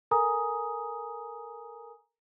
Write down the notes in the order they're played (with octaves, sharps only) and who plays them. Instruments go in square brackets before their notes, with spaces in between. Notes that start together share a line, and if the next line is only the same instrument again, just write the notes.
[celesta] A4 A#4 G#5 A#5 D#6